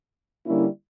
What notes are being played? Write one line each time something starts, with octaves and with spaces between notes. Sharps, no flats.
D3 G3 A#3 C#4 E4